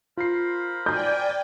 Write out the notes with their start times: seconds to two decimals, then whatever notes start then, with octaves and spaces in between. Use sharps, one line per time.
0.17 F4 A#4 C5 B5 C7
0.86 D5 G5 G#5 G6